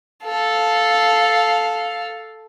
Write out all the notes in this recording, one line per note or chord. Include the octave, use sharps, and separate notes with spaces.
A4 F5